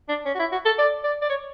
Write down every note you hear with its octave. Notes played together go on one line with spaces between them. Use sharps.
D4
C#4
F#4
E4
F#4
A4
D5
D5
D5
C#5